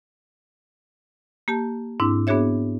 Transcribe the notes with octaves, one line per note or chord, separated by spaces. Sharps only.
A#3 G4 A5
G#2 C4 D4 E4
B3 D4 F#4 G#4 C#5 E5